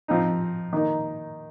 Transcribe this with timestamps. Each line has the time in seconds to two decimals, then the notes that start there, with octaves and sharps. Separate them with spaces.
0.08 F3 C4 D#4
0.73 D#3 A#3 D#4